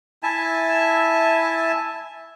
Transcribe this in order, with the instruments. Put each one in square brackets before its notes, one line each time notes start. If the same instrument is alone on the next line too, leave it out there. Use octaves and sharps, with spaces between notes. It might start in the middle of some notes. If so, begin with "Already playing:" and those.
[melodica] E4 E5 G#5 A5